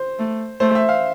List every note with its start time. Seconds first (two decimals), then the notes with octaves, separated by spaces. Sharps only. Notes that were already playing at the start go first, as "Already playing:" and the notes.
Already playing: C5
0.19 A3
0.60 A3 C5
0.75 E5
0.89 F5